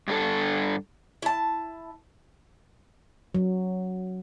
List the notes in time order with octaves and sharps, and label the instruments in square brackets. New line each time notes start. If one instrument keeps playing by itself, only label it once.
[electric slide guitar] G2 D4 A4
[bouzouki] E4 A5
[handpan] F#3